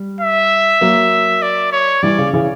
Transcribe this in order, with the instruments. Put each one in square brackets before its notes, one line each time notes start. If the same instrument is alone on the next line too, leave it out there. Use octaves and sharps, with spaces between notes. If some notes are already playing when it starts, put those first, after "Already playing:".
Already playing: [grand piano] G3
[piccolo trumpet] E5
[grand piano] F#3 A#3
[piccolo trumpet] D5
C#5
[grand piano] E3 G3 [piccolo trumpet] D5
[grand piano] C#3
C#3 E3